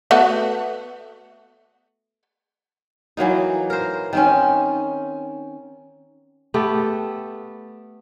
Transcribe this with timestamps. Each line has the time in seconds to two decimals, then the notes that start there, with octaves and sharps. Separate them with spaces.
0.11 A3 B3 F#4
3.17 E3 F#3 A#3 D#4
3.70 A#4 C5
4.13 D#3 C4 C#4
6.54 A3 B3 G4 A4